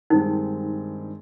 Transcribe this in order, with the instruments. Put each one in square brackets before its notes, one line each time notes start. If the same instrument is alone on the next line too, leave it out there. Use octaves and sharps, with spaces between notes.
[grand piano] G2 D#3 G#3 C4 [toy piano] D#4